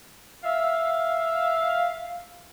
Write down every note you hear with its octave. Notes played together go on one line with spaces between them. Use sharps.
E5 F5